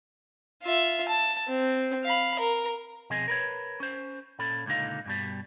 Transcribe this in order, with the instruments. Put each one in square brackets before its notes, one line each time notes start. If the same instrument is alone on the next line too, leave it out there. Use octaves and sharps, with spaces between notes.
[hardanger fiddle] F4 E5
A5
C4
F5 B5
A#4
[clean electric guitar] B2 F3 C4 G#4 D#5 G#5
A#4 B4 C#5
C#4 C5
A#2 C#4 A4 B5
C#2 A#2 D3 D#4 F5
G2 B2 G3